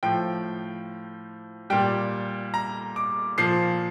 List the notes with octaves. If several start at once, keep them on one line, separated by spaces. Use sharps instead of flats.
A2 F3 G5
A#2 G3 G5
A#5
D6
A#2 F3 C7